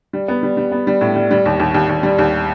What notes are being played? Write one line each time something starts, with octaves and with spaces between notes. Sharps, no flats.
G3
B3
G3
G3
B3
G3
A2
G3
G3
D#2
D#2
D#2
D#2
G3
D#2